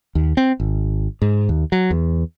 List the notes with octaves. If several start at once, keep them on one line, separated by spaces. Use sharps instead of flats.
D#2
C4
G#1
G#2
D#2
F#3
E2